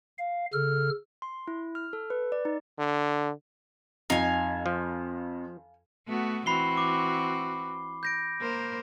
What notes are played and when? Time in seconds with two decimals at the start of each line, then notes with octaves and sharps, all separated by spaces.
0.18 F5
0.53 C#3 A4 F6
1.22 C6
1.48 E4
1.75 F6
1.93 A4
2.10 B4
2.32 D5
2.45 D#4
2.79 D3
4.10 F2 D#4 F5 G#5
4.66 F3
6.08 A3 B3 F#4
6.46 E3 C4 F#4 B5 C7 G7
6.77 D6
8.03 G6 A#6 D7
8.41 A#3 A#4 C5